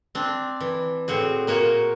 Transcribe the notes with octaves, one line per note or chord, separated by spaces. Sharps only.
C4 D4
E3
A2 C4 F#4 G#4
A#2 A#3 F#4 C#5